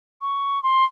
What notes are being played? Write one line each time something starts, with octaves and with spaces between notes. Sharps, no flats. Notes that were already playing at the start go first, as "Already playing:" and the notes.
C#6
C6